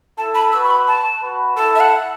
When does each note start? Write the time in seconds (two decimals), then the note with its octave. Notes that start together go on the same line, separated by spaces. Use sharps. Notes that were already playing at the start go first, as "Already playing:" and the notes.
0.17 E4 A4 A5
0.35 B5
0.52 F#4 B4 E6
0.65 C#6
0.70 B5
0.88 A5
1.22 F#4 B4
1.56 E4 A4 A5
1.75 E5
1.80 F#5